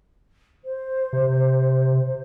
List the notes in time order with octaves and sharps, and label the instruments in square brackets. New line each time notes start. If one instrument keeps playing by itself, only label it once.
[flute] C5
[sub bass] C3